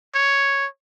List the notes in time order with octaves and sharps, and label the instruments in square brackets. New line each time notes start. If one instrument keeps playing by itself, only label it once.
[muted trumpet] C#5